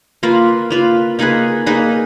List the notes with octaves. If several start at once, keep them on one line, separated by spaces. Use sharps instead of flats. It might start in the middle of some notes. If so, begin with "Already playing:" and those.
A#3 F4 B4
A#3 F4 B4
A#3 D#4 G#4 B4
A#3 D#4 G#4 B4